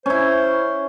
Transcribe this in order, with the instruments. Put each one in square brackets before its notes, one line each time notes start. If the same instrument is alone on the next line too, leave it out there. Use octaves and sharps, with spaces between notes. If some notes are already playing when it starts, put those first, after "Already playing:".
[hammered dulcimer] C#4 E4 [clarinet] C5